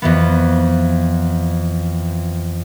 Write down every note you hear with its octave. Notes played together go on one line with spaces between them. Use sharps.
F2 E3 B3